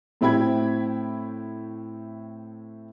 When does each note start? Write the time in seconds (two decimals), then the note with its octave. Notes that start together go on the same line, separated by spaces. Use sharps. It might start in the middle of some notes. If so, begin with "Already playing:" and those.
0.21 A2 C4 E4 G5 B5 G#6